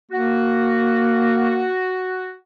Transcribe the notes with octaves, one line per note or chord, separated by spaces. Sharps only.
A#3 F#4